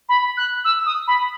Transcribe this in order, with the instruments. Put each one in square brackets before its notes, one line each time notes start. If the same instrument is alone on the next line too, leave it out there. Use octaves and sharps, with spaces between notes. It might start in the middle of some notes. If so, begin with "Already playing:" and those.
[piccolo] B5
F#6
E6
D#6
B5